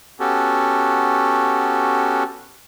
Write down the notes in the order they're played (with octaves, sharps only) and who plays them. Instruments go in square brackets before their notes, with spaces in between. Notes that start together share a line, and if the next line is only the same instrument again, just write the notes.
[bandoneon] B3 C#4 F#4 G4 A4